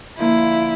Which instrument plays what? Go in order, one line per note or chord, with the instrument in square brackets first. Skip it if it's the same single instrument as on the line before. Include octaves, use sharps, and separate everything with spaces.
[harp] D3 F3 A#3 [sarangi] E4